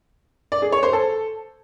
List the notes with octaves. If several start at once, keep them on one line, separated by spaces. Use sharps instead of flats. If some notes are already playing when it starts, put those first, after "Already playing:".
D5
G#4
C#5
C5
A4